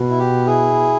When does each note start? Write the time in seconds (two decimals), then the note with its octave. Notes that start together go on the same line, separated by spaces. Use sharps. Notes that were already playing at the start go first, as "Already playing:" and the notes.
Already playing: B2
0.10 E4
0.19 G4
0.46 E4 G#4